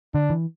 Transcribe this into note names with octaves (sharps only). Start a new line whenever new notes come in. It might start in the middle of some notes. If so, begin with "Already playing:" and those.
D3 D4
E3